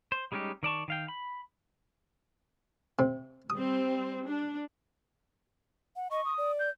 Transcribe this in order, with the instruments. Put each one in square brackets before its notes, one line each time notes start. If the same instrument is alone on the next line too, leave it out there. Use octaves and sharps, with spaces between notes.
[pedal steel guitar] C5
G3 G#3 C#4 D#4 G4
D#3 D5 A5 C#6
D#3 F5 G5
B5
[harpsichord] C3
[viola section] G3 C4 [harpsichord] D#6
[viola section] D4
[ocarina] F#5
[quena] D#5 [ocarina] C#6
[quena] D#6
[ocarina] D5
[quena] G6